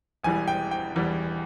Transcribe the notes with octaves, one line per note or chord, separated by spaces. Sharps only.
E1 E2 E3 G3 G#5
G5
G5
E1 E2 E3 G3